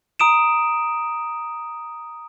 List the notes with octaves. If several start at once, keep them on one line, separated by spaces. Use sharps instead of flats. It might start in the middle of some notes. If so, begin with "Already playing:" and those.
A#5 D#6 D7 E7